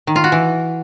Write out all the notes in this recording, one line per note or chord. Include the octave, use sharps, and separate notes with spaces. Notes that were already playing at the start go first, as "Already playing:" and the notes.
D#3
F4
F#4
E3